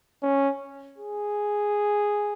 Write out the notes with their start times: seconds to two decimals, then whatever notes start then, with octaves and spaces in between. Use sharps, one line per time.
0.23 C#4
0.98 G#4